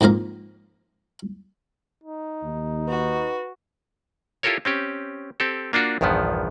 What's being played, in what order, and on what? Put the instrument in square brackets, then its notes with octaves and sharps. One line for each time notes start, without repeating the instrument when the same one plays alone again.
[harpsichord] F2 G#2 A#3 F5 A#5
[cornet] D#4
[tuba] D#2
[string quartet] F#4 [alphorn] B4
[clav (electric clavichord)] E4 F4 G4 A4 A#4 C#5
C4 C#4 G4
C4 G4 A4
A#3 D4 F4 F#4
A#1 E2 G2 D#3 F3 B3